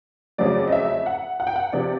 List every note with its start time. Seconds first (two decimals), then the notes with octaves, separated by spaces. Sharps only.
0.38 F2 C#3 F#3 A3 D5
0.68 D#5
0.72 E5
1.06 F#5
1.40 F#5
1.47 G5
1.56 F#5
1.73 C3 F3 D5